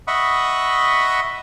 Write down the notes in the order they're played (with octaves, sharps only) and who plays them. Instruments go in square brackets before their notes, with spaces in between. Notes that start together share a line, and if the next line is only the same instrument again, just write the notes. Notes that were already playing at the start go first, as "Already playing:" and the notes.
[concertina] D#5 E5 F#5 B5 C#6 D#6